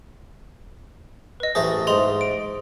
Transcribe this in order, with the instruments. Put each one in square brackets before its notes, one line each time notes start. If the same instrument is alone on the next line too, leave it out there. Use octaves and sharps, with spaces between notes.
[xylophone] B4 D#5
[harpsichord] A1 A3 G#4 [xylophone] C5
[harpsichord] G#2 D#5 [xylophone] G#4 C6 F7
[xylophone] D7